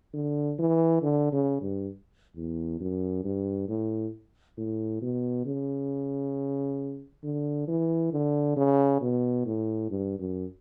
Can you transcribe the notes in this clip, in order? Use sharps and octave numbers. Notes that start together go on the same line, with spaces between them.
D3
E3
D3
C#3
G2
E2
F#2
G2
A2
A2
B2
C#3
D3
E3
D3
C#3
B2
A2
G2
F#2